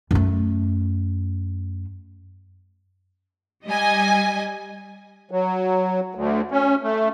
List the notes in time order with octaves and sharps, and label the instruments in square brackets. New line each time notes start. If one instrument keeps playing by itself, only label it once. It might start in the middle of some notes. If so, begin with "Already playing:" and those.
[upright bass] F#2 A3
[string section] G3 D#5 G#5
[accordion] F#3
D2
C#4
A3